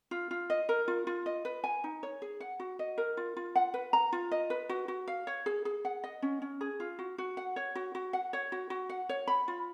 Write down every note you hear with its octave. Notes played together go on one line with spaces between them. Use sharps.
F4
F4
D#5
A#4
F4
F4
D#5
B4
G#5
D#4
C#5
G#4
F#5
F#4
D#5
A#4
F4
F4
F#5
B4
A#5
F4
D#5
B4
F#4
F#4
F5
C#5
G#4
G#4
F#5
D#5
C#4
C#4
G#4
F4
F#4
F#4
F#5
C#5
F#4
F#4
F#5
C#5
F#4
F#4
F#5
C#5
B5
F4